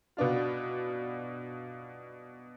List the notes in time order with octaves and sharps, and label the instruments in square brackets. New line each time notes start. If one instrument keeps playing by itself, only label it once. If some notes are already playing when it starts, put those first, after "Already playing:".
[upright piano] B2 B3 D4 F4